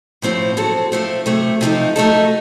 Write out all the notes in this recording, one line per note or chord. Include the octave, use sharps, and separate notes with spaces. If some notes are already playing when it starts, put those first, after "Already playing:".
A2 F3 C4 F#4
F#3 C4 F#4 A4
F3 A3 C4
C3 F#3 A3
C3 F3 A3 D#4
F#3 A3 D#4 A4